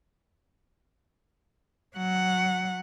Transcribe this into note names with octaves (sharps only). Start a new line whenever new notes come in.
F#3 F#5